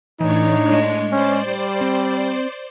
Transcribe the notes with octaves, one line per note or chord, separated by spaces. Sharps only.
A2 E3 D4 D#4 C#5
G#3 D#5
C#4 C5 D5
G3
C4